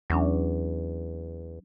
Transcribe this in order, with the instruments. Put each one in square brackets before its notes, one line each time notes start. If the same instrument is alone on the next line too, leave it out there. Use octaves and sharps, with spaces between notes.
[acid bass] E2 [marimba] F#3 C#4 D4